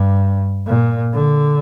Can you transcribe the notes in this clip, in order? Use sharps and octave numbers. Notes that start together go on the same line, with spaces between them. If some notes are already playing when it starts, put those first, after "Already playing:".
Already playing: G2
A#2
D3